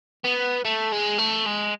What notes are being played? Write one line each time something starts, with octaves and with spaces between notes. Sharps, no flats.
B3
A3
G#3
A3
G#3